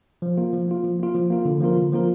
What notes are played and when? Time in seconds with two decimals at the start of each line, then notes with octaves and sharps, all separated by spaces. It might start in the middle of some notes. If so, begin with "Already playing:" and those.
0.22 F3
0.38 A#3 F4
0.53 F3
0.68 A#3 F4
0.84 F3
0.99 A#3 F4
1.15 F3
1.30 A#3 F4
1.45 D3
1.61 F3 A#3 F4 A#4
1.77 D3
1.92 F3 A#3 F4 A#4